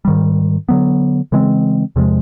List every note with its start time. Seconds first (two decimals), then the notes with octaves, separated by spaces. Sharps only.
0.05 G#2 D#3 G3
0.69 D3 F#3 B3
1.32 C#3 E3 G#3 C4
1.96 E2 C3 F3 G#3